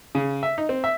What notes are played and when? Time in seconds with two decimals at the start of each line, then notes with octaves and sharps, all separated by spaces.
0.15 C#3
0.43 E5
0.58 D#4
0.69 C4
0.84 E5